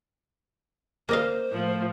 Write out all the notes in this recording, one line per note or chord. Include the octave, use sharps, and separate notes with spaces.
A#3 C5 D#5 F5
A2 F3